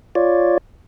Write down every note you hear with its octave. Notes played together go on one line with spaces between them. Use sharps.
F4 C#5 D5